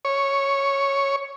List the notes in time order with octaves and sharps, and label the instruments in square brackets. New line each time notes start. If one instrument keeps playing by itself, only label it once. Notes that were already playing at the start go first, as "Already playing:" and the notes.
[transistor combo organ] C#5